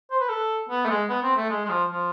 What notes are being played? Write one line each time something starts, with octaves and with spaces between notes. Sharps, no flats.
C5
B4
A4
B3
A3
G#3
B3
C4
A3
G#3
G#3
F3
F3